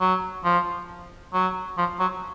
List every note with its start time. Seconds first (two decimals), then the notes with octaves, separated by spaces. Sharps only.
0.01 F#3
0.45 F3
1.34 F#3
1.78 F3
2.00 F#3